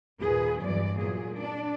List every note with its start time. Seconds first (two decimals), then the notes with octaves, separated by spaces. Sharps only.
0.20 D#2 A#2 G#4 B4
0.61 E2 G2 E3 F#3 D5
0.97 A#2 F#3 G#4
1.36 D4 D5